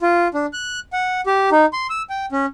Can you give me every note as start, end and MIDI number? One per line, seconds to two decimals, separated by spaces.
0.01 0.28 65
0.34 0.46 62
0.53 0.80 90
0.93 1.21 78
1.26 1.49 67
1.52 1.66 63
1.73 1.87 84
1.90 2.03 88
2.10 2.26 79
2.32 2.46 61